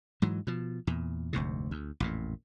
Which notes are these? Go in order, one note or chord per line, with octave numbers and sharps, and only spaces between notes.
G#2 E3 F#3
B2 F3
E2 A#2
F1 D2 G#2 C3
D2
A1 F2 A#2